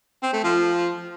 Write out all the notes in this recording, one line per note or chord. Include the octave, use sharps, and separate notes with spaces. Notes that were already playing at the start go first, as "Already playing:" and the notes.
C4
A3
F3